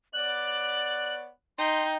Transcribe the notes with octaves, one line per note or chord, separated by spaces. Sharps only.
B3 C#5 D5 F#6 F#7
D#4 G5 C6